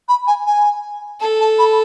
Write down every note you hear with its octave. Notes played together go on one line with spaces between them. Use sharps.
B5
G#5
G#5
A4 A5
A5
B5